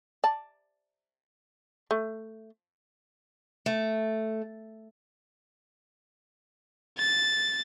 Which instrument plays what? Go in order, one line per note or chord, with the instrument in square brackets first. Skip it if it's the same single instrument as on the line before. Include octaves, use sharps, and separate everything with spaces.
[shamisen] D5 A5
A3
[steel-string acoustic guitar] A3
[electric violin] A6